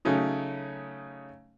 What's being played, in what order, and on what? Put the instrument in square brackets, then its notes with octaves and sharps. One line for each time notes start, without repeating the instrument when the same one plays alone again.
[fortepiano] C#3 F#3 A3 C#4 D#4